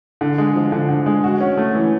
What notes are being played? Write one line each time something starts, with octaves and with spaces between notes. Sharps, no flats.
D3
G#3
F3
D3
D3
G#3
F#4
C#4
A3
E3